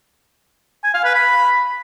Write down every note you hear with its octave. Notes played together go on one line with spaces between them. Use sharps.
G#5
F5
B4
B5